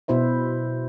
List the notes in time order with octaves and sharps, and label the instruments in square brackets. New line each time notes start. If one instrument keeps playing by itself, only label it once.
[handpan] B2 E4 C5 E5